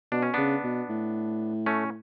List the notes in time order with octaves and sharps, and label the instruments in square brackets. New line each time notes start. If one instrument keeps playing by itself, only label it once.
[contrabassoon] B2 [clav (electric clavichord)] D4
[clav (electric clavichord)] C#4
[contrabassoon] C#3 [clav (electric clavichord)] B3 D4
[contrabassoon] B2
A2
[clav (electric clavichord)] A3 C#4